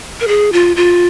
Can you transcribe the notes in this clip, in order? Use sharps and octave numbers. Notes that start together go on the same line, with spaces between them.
A#4
G#4
F4
F4